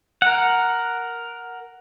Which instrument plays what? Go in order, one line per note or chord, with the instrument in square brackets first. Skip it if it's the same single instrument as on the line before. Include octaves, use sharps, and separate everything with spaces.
[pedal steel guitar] A#4 F#5